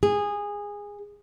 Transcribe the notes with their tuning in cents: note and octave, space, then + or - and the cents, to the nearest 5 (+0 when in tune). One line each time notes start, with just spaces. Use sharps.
G#4 -15